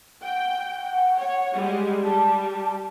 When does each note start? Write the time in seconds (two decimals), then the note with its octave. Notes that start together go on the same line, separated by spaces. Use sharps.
0.22 F#5 G5
1.19 C#5
1.55 G3 G#3
2.03 G3 G4 A5